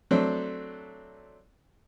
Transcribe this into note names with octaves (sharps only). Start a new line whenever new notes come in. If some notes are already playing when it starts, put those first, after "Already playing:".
F#3 A3 C4 D4